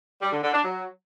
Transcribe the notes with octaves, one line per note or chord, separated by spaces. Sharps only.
G3
D3
D3
D4
F#3